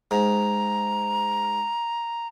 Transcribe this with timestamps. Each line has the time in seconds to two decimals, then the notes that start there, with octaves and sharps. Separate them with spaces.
0.11 G#2 A#5